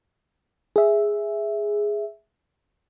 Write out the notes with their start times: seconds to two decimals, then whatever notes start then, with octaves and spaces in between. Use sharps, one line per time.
0.76 G#4 E5